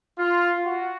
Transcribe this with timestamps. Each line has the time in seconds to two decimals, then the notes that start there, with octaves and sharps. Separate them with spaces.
0.18 F4
0.65 F#4